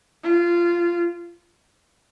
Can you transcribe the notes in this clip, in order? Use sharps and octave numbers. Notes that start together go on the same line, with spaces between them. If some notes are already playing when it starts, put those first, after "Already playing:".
F4